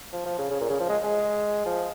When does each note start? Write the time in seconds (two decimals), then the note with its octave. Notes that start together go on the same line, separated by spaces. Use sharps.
0.13 F3
0.25 F3
0.38 C#3
0.50 C#3
0.61 A#2
0.69 C#3
0.80 F3
0.89 G#3
1.04 G#3
1.66 F3